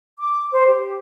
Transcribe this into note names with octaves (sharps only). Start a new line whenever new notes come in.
D6
C5
G4